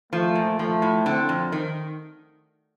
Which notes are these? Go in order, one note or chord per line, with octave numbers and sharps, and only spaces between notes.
F3 A3
A#2
F3 A3
A2
D3 C4
F2
D#3